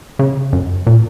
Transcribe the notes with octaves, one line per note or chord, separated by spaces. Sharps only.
C#3
F#2
A#2